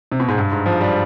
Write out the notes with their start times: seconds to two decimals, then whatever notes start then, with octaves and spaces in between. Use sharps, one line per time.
0.12 C3
0.20 B2
0.28 G#2
0.38 G2
0.52 G#2
0.66 F3
0.81 G3